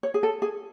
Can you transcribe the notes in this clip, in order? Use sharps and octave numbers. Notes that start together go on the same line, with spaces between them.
C#5
G#4
A4
G#4